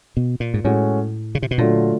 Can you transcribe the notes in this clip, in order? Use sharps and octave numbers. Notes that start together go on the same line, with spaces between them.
B2
A#2
G#2
A2 G#3 C#4 F#4 A4
C#3
C3
B2
A#2 D3 F#3 A3 D4 F4